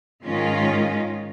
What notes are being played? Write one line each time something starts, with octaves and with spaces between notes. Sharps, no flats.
G#2 D#3 G#3 C#4 F4